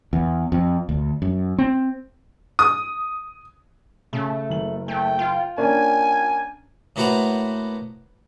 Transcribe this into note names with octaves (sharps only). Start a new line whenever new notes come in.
E2
F2
D2
F#2
C4
D#6
C#3 A3
F#1 F#7
A3 G5
F4
A#3 C#4 D4 G#5
A2 A#3 B3 F#4 C5 A#5